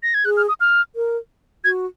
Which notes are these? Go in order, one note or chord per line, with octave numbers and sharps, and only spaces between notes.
A#6
G#6
G#4 F#6
F6
D#6
F6
A#4
F#4 G#6